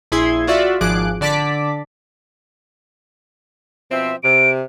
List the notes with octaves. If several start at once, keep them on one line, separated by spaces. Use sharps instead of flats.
A#1 E4 G#4 C6 G#6
F4 F#4 D5 E5
G#1 F3 G#4 D6 F#6 D7
D3 D5 A5 D6 B6
B2 F3 C4 E5
C3 D7